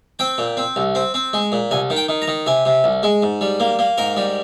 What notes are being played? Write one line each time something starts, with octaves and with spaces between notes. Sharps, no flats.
C4 G5
A#2
C4
C2
C4
C4
G#3
A#2
C2 G#5
D#3
G5
D#3
A#5
D#3
C3 G#5
C3
C2
G#3
G#2
G3
A#3
A#3
G#2 A#4
G3